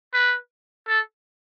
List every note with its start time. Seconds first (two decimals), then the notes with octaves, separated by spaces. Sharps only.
0.14 B4
0.88 A4